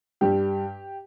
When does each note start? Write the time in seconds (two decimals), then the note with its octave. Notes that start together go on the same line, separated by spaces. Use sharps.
0.21 G2 G3 G4